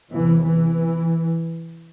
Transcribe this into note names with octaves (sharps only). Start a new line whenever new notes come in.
E2 C3 E3
E3